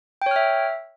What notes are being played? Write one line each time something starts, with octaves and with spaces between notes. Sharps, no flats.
C#5 E5 G5 F6